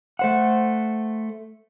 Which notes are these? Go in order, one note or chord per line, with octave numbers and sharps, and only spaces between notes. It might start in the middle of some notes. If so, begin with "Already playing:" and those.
A3 C5 F#5